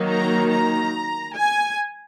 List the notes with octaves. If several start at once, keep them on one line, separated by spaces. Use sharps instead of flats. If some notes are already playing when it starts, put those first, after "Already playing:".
Already playing: D#3 F#3 A#3 D#4
A#5
A#5
G#5